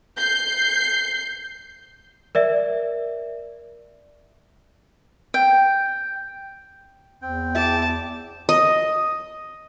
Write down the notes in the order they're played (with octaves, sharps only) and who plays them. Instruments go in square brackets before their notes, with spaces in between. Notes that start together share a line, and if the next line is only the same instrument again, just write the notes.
[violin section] G6 C7
[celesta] A#4 D5 E5
[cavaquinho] G5
[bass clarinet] E2 [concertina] C4 G5
[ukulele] E4 G#4 E5 [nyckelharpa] A5 D6
[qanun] D#5